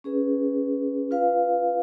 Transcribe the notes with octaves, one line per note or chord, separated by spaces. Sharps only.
C#4 G#4 B4
F4 B4 F5